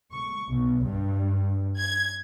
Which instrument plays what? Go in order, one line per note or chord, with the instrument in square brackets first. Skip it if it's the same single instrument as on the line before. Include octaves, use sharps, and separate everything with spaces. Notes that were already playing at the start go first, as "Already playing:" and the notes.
[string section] C#6
B1
G2
G#6